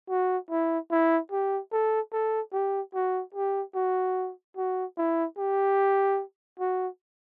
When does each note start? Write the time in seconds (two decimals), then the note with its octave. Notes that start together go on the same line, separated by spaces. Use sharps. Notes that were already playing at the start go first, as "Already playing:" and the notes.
0.09 F#4
0.50 E4
0.91 E4
1.31 G4
1.72 A4
2.12 A4
2.53 G4
2.94 F#4
3.34 G4
3.75 F#4
4.57 F#4
4.97 E4
5.37 G4
6.59 F#4